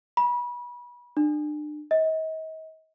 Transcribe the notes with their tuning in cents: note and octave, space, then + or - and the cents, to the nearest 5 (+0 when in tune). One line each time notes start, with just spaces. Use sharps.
B5 -30
D4 +35
D#5 +40